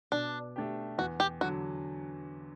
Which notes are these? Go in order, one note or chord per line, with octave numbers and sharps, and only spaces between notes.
B2 D4
A3 D4 G4
E2 F#4
G4
D3 F#3 F#4